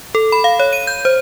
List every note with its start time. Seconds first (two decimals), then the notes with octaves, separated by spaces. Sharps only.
0.15 A4
0.32 B5
0.44 F5
0.60 C#5
0.73 D#7
0.87 G6
1.05 C5